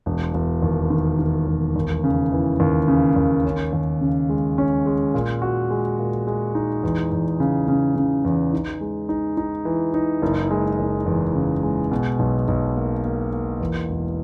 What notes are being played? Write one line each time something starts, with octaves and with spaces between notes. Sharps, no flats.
E1
E1
D#2
D#3
D#3
E1
D#2
C#3
E3
D#2
C#3
D#2
C#4
D#2
C#3
G#3
C#4
G#3
A#2
F#4
G#3
A#2
G#3
D#4
E2
E2
C#3
C#3
C#3
E2
D#4
G#3
D#4
D#4
E3
D#4
F#1
G#3
F#1
E2
C#3
G#3
B2
B1
B1
A#3
A#3
A#3
E2
E1